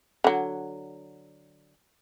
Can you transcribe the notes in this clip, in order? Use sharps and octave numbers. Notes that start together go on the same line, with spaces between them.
D3 F#3